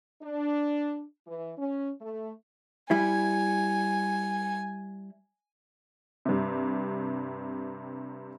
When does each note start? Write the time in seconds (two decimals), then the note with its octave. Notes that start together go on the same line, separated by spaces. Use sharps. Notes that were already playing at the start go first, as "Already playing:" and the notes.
0.21 D4
1.26 E3
1.57 C#4
2.01 A3
2.91 G3 E4 G#5
6.25 G2 C3